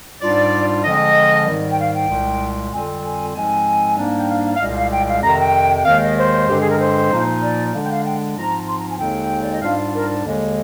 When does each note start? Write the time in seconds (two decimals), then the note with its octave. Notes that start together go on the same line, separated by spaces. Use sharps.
0.20 G#2 G3 D4 F4 D5
0.84 D3 F3 G#3 C4 D#5
1.46 G#2 D#3 G3
1.71 G5
1.78 F5
1.93 G5
2.09 C2 A#2 G#3
2.71 F2 D3 G3 C4 F4 G#5
3.04 G#5
3.34 G#2 F3 G#3 C4 G#5
3.97 G#2 G3 A#3 D4
4.19 G5
4.29 F5
4.45 F5
4.56 F5
4.60 C2 A#2 G#3 D#5
4.75 F5
4.91 G5
5.08 F5
5.22 F2 C3 D#3 A#5
5.39 G5
5.76 G5
5.85 D#2 D#3 G#3 F5
6.02 D#5
6.17 C5
6.48 G2 D3 G#3 C4 G4
6.60 G#4
6.69 A#4
6.79 C5
7.12 A#2 F3 A#3 D#4
7.42 D5
7.73 D3 G#3 D4
7.85 G5
7.89 F5
8.05 G5
8.37 G#2 F3 C4 F4 A#5
8.67 C6
8.78 A#5
8.89 G#5
8.99 D#2 D3 G#3 C4 D#4 G5
9.41 D5
9.52 D#5
9.61 G#2 G3 D4 F4 F5
9.94 A#4
10.25 D#2 D3 G#3